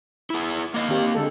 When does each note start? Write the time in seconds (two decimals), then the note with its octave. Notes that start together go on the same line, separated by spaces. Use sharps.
0.30 E4 G#4
0.74 A#3 D#5 F5
0.89 D#3 C4 G4
1.15 D3 G#3 A4